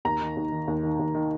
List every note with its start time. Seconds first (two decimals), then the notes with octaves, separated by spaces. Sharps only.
0.05 D#2 A#5
0.21 D#3
0.37 D#2
0.52 D#3
0.68 D#2
0.83 D#3
0.99 D#2
1.15 D#3